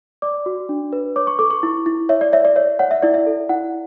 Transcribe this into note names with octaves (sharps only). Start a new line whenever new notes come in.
D5 D6
F#4
D4
B4
C#5 D6
C#6
A4 D6
C#6
E4
E4
C#5 E5
D5
C#5 E5
D5
C#5 E5
C#5 F#5
E5
E4 D5
E5
A4
E4 F#5